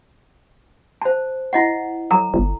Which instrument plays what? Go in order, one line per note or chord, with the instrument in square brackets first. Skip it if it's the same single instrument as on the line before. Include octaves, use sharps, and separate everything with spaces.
[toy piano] C5 A5
E4 D#5 F#5
[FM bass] F#3 [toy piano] A4 A#5
[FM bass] G1